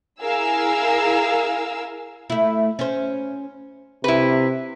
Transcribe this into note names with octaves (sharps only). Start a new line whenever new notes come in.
E4 G#4 A#4 F5 E6
A3 E4
C#4 C5
C3 E4 B4